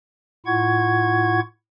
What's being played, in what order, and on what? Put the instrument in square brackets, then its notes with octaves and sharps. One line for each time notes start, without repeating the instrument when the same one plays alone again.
[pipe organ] A2 E4 F4 F#5 C#6 G#6